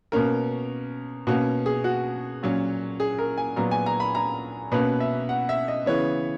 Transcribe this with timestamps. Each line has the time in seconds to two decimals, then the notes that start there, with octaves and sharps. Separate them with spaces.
0.12 B2 A#3 C#4 A#4
1.27 B2 A#3 C#4 F#4
1.66 G#4
1.84 F#4
2.43 A#2 F#3 C#4
3.00 G#4
3.19 A#4
3.37 G#5
3.56 A#2 F#3 B3 A#5
3.71 G#5
3.86 A#5
4.00 B5
4.15 A#5
4.72 B2 A#3 C#4 B4
5.00 E5
5.29 F#5
5.49 E5
5.68 D#5
5.86 C#3 E3 B3 C#5